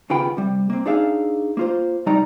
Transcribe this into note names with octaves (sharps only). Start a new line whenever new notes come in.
D#2 C#3 B3 F4 G5 B5
C3 G3
A#3 C4
D4 D#4 G#4 E5 F5
A#3 F4 C5
C3 G3 D#4 D5 A#5